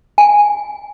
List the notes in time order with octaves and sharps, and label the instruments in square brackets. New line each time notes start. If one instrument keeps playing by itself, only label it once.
[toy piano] G#5